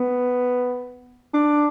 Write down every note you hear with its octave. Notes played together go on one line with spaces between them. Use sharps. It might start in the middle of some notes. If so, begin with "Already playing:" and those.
Already playing: B3
D4